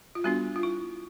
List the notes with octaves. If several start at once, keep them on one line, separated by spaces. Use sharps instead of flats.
F4
G3 B3 D4 F#4
F4
E4